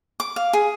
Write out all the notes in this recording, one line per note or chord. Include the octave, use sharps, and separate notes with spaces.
D6
F5
G#4